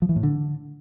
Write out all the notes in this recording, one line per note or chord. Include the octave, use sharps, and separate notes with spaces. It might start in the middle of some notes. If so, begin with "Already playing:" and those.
F3
E3
A2
D3